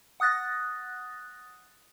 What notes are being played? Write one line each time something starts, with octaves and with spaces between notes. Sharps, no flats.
F#5 D#6 F#6 A6 A#6